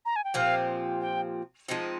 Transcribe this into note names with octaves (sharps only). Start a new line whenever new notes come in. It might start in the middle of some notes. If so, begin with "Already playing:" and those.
A#5
G#5
G5
A#2 F3 C4 G4 F5
G5
F3 G#3 C4 D#4